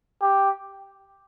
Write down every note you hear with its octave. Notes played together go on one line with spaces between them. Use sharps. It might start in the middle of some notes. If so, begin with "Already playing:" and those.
G4